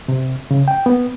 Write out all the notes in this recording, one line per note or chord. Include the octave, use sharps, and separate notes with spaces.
C3
C#3
G5
B3